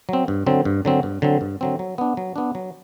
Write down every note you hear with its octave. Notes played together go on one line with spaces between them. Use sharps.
F#3 C4
G2
D3 F#3 C4
G2
D3 F#3 C4
G2
D3 F#3 C4
G2
D3 F#3 C4
F#3
B3 D4
F#3
B3 D4
F#3